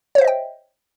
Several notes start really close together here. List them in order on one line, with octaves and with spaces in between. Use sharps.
C#5 C5 E5 D#5 G5